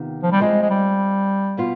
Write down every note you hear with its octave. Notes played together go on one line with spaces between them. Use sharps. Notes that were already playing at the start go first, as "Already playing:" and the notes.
Already playing: C3 D#3 B3 F4
F3
G3
G#3 C4 F4 C5
G#3
G3
B2 B3 F4